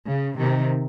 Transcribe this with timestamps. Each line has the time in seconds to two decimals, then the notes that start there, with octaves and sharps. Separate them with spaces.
0.09 C#3
0.36 C3 D#3